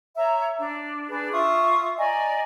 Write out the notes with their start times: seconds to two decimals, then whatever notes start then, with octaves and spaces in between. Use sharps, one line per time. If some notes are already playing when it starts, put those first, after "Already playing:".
0.16 C#5 E5 A#5
0.59 D4
1.09 D4 G#4 B4
1.32 F4 E5 C#6 D#6
1.98 D5 D#5 G#5 A#5